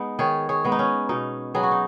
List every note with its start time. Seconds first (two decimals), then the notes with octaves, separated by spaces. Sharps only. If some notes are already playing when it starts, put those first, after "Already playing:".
Already playing: G#3 B3 D#4
0.19 D#3 G#4 C#5
0.49 G#4 C#5
0.64 G#3 B3
0.72 D#4
0.79 C#4
1.09 B2 D#4
1.54 F#3 B3 G#4
1.63 F#4
1.71 D#4